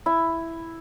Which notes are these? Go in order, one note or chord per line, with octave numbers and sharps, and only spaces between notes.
E4